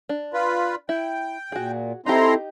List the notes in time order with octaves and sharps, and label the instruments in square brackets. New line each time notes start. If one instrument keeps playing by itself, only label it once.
[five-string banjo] D4
[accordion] F4 B4
[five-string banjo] E4 [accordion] G5
[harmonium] A#2 [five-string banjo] F#4 G#4
[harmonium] C4 E4 A4 [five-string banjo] D#4 G4 [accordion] A#5 C6